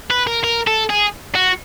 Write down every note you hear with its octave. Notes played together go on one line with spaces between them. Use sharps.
B4
A#4
A#4
A4
G#4
F#4